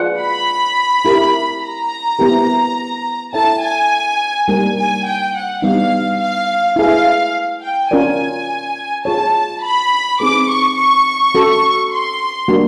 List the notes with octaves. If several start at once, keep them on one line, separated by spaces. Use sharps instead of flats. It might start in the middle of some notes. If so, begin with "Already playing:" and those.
Already playing: F4 G#4 B4 D5 F#5
B5
E4 G4 A#4
A#5
B3 E4 G4 A#4
E4 A4 C#5 E5 G5 A5
G#5
G3 A#3 D#4 G4 A#4 G#5
G#5
G5
F#5
G3 B3 D#4 F5
F5
E4 G#4 B4 F5
G5
C#4 F4 A#4 D5 G#5
F4 G#4 C#5 A5
B5
C4 D#4 G#4 B4 D6
C#6
C#6
C#4 F#4 A4
C6
G3 A#3 D4 F#4